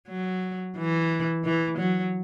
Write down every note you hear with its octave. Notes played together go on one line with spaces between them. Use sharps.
F#3
E3
E3
F#3